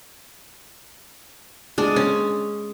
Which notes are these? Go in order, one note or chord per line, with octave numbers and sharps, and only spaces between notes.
G#3 D4
C#4